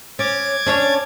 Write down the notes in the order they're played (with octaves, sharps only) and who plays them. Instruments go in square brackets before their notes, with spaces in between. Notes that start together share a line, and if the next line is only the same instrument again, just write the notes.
[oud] C#4 [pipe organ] D6 G#6 A6
[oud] C#4 D4 C#5